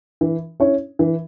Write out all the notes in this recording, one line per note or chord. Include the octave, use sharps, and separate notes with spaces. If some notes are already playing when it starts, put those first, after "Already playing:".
E3
C#4 E4 C#5
E3